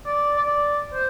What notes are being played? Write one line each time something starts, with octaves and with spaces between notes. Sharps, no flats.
D5
D5
C5